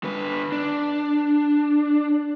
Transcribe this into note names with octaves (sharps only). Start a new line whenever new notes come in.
D3 B4
D4